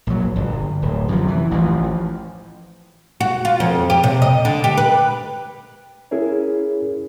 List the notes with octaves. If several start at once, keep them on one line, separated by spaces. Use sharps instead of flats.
A#1 F#3
G1
D1
F#2 C3 E3 F3
E3
A1 E3 F3
F#4
F4
F2
G4
C3
D#5
D3
G4
B4
C#4 E4 G#4 A#4 C#5